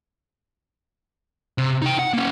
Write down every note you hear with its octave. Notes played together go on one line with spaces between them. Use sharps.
C3
D#4 G5
F#5
A#3 C#4